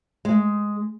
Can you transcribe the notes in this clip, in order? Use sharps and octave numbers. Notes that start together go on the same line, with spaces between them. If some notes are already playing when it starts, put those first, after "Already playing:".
G#3